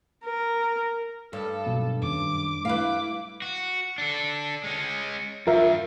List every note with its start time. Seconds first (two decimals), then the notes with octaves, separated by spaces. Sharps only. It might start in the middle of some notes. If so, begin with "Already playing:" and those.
0.24 A#4
1.33 G2 A4
1.66 B2 F#3 A#3
2.02 F#2 D#3 C#4 D6
2.65 G3 A3 E4 B4 F5 D6
3.42 F#4
3.98 D4 A4
4.64 G#3 C#4
5.47 G2 F4 A#4 E5